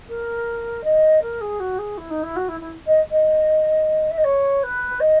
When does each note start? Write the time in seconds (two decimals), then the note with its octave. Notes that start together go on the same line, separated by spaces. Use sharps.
0.08 A#4
0.84 D#5
1.22 A#4
1.41 G#4
1.60 F#4
1.78 G#4
1.97 E4
2.10 D#4
2.23 E4
2.36 F#4
2.48 E4
2.60 E4
2.87 D#5
3.11 D#5
4.10 E5
4.17 D#5
4.24 C#5
4.63 B4
5.00 D#5